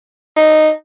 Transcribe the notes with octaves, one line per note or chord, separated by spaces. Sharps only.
D#4